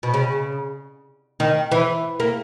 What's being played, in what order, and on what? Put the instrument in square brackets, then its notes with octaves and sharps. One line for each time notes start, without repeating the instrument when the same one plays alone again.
[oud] B2
C#3
D#3
E3
A#3